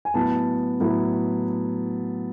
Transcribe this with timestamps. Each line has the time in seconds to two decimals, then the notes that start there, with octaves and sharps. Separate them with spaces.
0.05 G#5
0.14 A2 F#3 B3 E4 A5
0.80 A2 F#3 B3 E4